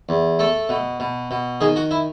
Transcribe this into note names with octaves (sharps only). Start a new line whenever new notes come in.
E2
A3 A4
B2
B2
B2
D#3 G#4
F#4
E4